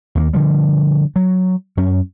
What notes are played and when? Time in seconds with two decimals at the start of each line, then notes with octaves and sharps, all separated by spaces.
0.15 D#2 A3 A#3
0.33 D3 F3 G3
1.16 F#3
1.77 F#2 C#4